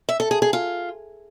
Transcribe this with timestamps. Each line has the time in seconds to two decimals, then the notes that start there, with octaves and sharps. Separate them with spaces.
0.09 E5
0.20 A4
0.31 G#4
0.42 G#4
0.53 F4